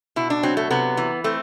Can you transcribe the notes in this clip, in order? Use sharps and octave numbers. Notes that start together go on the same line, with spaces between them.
B2 E4
D4
F#3 C4
A3
C3 B3
E3
A3 C4